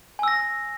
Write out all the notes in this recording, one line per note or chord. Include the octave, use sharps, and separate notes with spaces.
G#5 E6 A#6